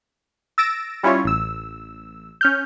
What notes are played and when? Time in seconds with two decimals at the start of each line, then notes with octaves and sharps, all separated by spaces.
0.58 E6 A6 A#6 D7 E7
1.03 G3 C#4 E4 F4 C#5
1.24 A1 E6
2.41 C#4 F6 G6